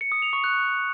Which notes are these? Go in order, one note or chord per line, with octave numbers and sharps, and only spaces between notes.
C#7
D#6
F7
C#6
F#6